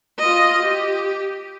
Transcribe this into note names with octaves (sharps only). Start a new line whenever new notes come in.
F4 D#5
G4